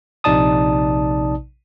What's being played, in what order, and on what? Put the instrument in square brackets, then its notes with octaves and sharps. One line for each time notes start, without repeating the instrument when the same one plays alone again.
[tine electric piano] A#1 C3 D#4 D5 A5 D#6